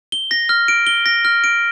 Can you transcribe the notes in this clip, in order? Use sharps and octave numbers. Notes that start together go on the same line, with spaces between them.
G7
A#6
F6
D7
G7
A#6
F6
D7